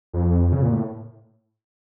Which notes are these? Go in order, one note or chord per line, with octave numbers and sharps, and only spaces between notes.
F2
C#3
A#2
A2